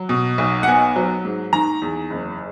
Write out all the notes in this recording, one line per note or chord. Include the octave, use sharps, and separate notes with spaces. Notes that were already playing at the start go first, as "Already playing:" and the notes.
Already playing: F#3
B2
B1
F#5
B3 G#5
F#3
G#2
D#3 A#5
E2
F#1